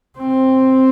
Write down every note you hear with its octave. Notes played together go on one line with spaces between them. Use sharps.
C4